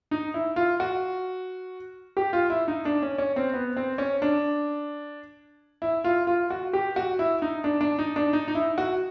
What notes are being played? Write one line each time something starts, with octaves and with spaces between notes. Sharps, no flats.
D#4
E4
F4
F#4
G4
F4
E4
D#4
D4
C#4
C#4
C4
B3
C4
C#4
D4
E4
F4
F4
F#4
G4
F#4
E4
D#4
D4
D4
D#4
D4
D#4
D#4
E4
F#4